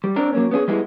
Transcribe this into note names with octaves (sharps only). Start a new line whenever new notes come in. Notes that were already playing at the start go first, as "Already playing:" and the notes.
G3
C4 D4 A#4
F#3 A#3 C#4
B3 C#4 E4 G#4
G3 G#3 B3 E4